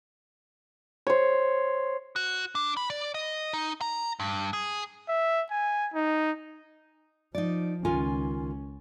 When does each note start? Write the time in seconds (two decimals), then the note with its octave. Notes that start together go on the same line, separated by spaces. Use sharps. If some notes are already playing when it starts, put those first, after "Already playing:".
1.07 C5 C#5
2.16 F#4
2.55 D4
2.77 B5
2.90 D5
3.14 D#5
3.53 D#4
3.81 A#5
4.20 G2
4.53 G#4
5.08 E5
5.51 G#5
5.94 D#4
7.35 F3 D#4 D5
7.85 C#2 D#3 C#4 F4 G#5